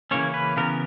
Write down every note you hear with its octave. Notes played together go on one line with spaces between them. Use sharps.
C#3 E3 A#3 C#4 C#5
B4
C#3 E3 B3 A#4